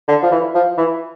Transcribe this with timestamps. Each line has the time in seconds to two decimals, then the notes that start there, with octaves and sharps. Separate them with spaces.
0.08 D3
0.23 F3
0.32 E3
0.55 F3
0.77 E3